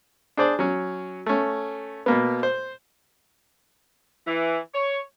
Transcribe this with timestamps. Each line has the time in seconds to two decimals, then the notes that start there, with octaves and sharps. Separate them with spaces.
0.37 D4 G#4 C5 D5
0.59 F#3 C#4
1.26 A3 C#4
2.06 B2 A#3 B3
2.43 C5
4.27 E3
4.74 C#5